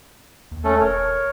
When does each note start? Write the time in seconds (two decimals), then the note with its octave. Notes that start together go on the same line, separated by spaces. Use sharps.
0.51 D#2
0.64 A3 C#4 A4
0.80 E1 A#4 C#5